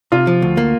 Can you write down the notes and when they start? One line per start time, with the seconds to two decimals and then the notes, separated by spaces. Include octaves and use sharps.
0.12 C3 F4
0.27 F3
0.42 D2
0.57 A#3